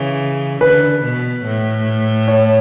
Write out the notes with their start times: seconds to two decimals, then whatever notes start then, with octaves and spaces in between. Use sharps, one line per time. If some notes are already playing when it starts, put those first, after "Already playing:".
Already playing: C#3 E3
0.61 D3 B4
1.03 B2
1.44 A2
2.28 C#5